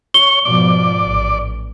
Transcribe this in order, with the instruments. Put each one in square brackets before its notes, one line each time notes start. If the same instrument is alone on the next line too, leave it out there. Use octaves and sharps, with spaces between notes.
[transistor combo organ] C#5 [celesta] G7
[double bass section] G#2 B2 F3 [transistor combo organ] D5
[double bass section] A1